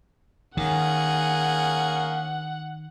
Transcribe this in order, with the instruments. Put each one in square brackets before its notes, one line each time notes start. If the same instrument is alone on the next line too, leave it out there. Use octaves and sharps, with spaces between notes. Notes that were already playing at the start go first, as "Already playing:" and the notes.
[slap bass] D#3 [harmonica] A#3 C#4 G#4 [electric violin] F#5